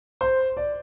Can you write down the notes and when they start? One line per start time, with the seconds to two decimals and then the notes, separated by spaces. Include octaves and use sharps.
0.21 C5
0.57 D5